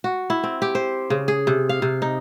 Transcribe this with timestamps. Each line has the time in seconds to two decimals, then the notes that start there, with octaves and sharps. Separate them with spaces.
0.04 F#4
0.30 E4
0.43 C4
0.62 G4
0.75 C5
1.10 C#3
1.28 G#4
1.47 C3
1.69 F5
1.82 C3
2.02 D#4